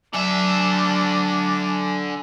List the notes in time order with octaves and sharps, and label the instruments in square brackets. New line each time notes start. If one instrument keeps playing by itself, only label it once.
[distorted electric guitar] D3 E5 [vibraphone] F#3 [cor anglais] D4 [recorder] G#5